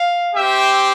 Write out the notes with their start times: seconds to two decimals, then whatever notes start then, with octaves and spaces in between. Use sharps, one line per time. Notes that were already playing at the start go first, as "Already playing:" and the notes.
Already playing: F5
0.35 C4 G4 E5